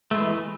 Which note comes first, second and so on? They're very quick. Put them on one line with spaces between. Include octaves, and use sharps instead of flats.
A3 G#3 E3